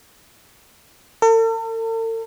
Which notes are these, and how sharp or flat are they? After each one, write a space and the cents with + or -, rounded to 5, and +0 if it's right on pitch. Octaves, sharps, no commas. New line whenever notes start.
A4 +45